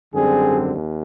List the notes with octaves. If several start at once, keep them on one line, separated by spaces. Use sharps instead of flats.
G#1 F#2 D3 G3 C4 G#4
D#2